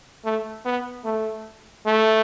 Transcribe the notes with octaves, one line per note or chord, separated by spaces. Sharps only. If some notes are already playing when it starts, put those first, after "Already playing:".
A3
B3
A3
A3